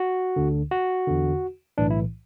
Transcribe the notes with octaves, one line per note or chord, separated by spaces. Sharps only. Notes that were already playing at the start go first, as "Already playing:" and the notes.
Already playing: F#4
D2 D3
F#4
E2 D3
B1 A2 E3 D4
E4